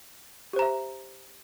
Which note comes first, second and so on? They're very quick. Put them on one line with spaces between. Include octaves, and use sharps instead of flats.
G4 C5 A#5 E5